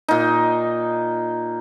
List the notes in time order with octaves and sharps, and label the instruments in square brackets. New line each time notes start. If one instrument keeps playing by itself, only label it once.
[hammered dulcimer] A#2 D#4